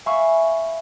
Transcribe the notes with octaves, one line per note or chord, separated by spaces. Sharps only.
E5 F5 G#5 B5 C#6